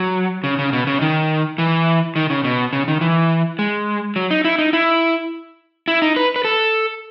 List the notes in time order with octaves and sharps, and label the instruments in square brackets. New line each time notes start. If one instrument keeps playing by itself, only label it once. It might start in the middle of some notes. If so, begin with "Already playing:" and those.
Already playing: [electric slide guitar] F#3
C#3
C#3
B2
C#3
D#3
E3
D#3
C#3
B2
C#3
D#3
E3
G#3
F#3
D#4
E4
D#4
E4
E4
D#4
B4
B4
A4